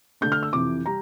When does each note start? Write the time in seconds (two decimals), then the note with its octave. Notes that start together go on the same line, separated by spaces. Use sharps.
0.21 D3 A3 D4 G6
0.32 F6
0.43 E6
0.53 F2 C3 E3 D6
0.86 G3 A#5